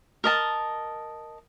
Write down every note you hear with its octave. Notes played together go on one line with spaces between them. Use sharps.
A#4 D#5 A5